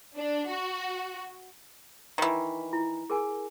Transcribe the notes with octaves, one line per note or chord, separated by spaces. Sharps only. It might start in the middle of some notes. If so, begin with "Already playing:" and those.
D4
F#4
D#3 E3 B4
E4
G#4 A#4 G#5